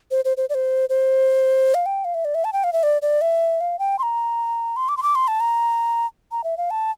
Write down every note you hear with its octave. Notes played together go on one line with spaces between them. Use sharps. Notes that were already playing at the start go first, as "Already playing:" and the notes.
C5
C5
C5
D5
C5
C5
F5
G5
F5
E5
D5
E5
A5
G5
F5
E5
D5
D5
E5
F5
G5
C6
A#5
C6
D6
C6
D6
C6
A5
A#5
A#5
E5
F5
A5